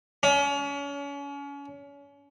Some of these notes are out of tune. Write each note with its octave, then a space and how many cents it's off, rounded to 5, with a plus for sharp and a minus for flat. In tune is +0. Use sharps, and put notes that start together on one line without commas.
C#4 +35